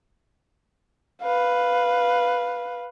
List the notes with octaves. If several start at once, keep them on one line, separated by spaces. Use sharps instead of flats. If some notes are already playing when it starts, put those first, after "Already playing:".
B4 F5